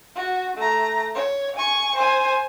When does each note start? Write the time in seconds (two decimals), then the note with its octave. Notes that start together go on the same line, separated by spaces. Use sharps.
0.16 F#4
0.57 A3 A#5
1.15 C#5
1.57 G#5 C#6
1.95 C5 G#5